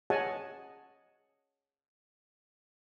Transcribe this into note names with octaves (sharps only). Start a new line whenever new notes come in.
G#4 C#5 D#5 F#5 G#5 A5